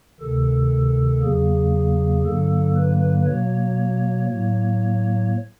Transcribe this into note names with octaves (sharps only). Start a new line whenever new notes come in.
D2 C3 D#3 A4
E2 C#3 F#3 A#3 G#4
G2 D3 F#3 A#3 A4
B4
B2 F#3 A#3 C#5
A2 F#3 A#3 C#5